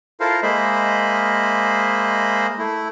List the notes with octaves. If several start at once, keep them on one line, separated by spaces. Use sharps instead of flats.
E4 F4 A4 A#4 C5 F5
G#3 A#3 C5 D#5 E5 B5
A3 E4